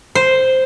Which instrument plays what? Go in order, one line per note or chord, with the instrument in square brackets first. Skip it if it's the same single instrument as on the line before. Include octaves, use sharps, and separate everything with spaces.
[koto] C5